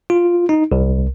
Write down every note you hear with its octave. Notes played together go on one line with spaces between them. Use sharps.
F4
D#4
C2